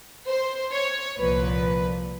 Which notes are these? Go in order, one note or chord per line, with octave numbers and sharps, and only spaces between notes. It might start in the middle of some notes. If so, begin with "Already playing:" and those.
C5
C#5
C2 A#2 F3 B4